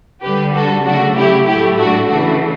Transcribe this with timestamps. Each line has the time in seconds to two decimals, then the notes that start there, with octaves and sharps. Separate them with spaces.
0.23 D3 G3 G4 B4
0.53 F#4 A4
0.85 C#3 F#3 A3 D4 F#4
1.16 E4 G4
1.47 A2 F#3 A3 E4 G4
1.78 D4 F#4
2.08 C#3 E3 A3 D4 F#4